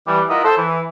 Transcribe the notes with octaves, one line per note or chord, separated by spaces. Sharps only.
E3 G3
E4 F4 A#4 D#5 F#5
A4 C5
E3